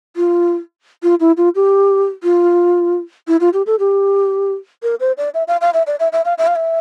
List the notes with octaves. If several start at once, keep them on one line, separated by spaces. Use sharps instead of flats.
F4
F4
E4
F4
G4
F4
E4
F4
G4
A4
G4
A#4
C5
D5
E5
F5
F5
E5
D5
E5
E5
F5
E5
F5
E5